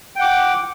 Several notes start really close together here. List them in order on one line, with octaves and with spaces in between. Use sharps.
G5 F#5 D6